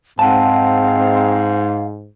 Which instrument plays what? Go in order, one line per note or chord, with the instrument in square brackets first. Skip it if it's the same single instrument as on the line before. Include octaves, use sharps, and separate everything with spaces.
[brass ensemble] G#2 [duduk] C4 [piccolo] F5 [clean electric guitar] F#5 A5